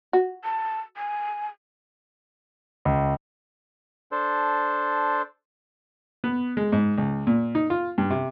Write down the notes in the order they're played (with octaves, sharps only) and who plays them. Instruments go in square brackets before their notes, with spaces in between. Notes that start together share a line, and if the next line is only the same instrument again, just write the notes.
[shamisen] F#4
[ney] A5
G#5
[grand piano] C#2
[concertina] D4 A4 C5
[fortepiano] B3
G#3
G#2
C#2
A#2
D#4
F4
G2
C3